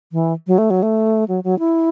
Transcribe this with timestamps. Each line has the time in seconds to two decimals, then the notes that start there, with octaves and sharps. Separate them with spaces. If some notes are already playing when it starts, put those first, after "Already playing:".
0.12 E3
0.47 F#3
0.58 A3
0.70 F#3
0.83 A3
1.28 F#3
1.44 F#3
1.59 E4